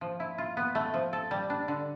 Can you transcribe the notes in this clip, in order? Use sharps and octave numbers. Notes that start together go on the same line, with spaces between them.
F3
E4
F4
B3
A3
F3
A4
G3
D4
D3